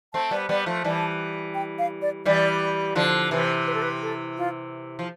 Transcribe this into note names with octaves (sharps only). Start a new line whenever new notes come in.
A3 C4 A5
G3 B3
G3 B3
F3 A3
E3 G3 A5
G5
F5
D5
E3 G3 D5
D3 F3 C5
C3 E3 B4
B4
A4
B4
A4
F4
F3